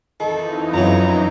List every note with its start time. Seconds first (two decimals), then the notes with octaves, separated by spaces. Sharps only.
0.20 F2 D#3 E3 D#4 A4
0.74 F#2 F3 F#3 C#5 A#5